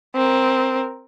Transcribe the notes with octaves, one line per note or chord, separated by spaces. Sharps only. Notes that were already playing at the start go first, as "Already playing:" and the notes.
C4 A#4